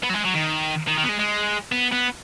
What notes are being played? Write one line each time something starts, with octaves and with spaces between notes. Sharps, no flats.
B3
F#3
G#3
F#3
D#3
D#3
D#3
B3
G#3
G#3
B3
B3